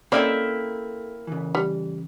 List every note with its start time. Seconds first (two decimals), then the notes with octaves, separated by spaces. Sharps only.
0.12 A#3 C4 C#4 E4 A4 C5 D5 D#5
1.27 C#3 E3
1.55 G3